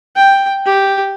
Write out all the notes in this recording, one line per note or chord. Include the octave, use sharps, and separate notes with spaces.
G5
G4